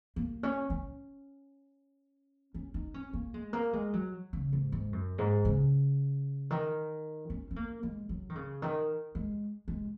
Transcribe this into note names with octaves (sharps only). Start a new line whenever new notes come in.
A#3
C#4
C#4
C#4
D#4
C#4
A#3
G#3
A#3
G#3
F#3
C#3
G#2
G#2
F#2
G#2
C#3
D#3
C#4
C#4
A#3
G#3
F#3
D#3
C#3
D#3
G#3
G#3